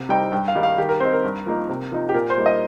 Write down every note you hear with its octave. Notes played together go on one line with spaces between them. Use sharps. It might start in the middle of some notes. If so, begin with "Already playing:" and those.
Already playing: C3
G3 C4 D#4 G5
G2 G5
F5
D#3 G3 D#4
F5
D#3 G4
A#4
C4 D#4 C5
A#4
G2
F3 A#3 D#4
C3
F3 D#4
G4
A#2 A#4
C5
G3 A#3 D#4
D#5